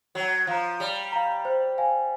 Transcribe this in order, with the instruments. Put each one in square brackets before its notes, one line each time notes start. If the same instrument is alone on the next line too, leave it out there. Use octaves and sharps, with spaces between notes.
[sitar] F#3 [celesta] C#5
[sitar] F3 [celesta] F5 A#5
[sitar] G3 [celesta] C#5
[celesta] F5 A#5
C5
F5 G#5